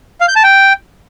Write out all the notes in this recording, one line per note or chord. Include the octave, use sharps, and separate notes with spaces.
F5
G6
A5
G5